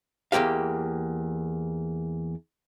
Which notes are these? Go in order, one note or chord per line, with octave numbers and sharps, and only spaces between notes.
E2 D#3 A#3 G4 F5